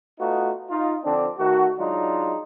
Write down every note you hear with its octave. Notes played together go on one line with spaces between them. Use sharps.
A3 B3 D#4 F4 F#4
D#4 F4
D3 F3 C4 D4
D#3 A3 F#4
F#3 G#3 D4 D#4 F4